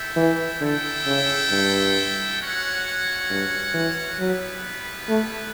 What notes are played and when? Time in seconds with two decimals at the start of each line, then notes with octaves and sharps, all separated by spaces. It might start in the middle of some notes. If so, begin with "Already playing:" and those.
Already playing: E4 A4 E5 G5
0.16 E3
0.60 D3 E4 A4 E5 G5
1.06 C#3
1.51 G2
2.40 C#4 F#4 C#5 F#5
3.30 G2
3.74 E3
4.19 F#3 G3 B3 E4 B4
5.09 A3